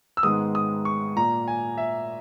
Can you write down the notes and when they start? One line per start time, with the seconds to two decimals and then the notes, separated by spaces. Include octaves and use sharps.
0.17 E6
0.23 G#2 D#3 G#3 B3 D#6
0.55 D#6
0.85 C#6
1.16 A#2 A#3 A#5
1.48 G#5
1.78 E5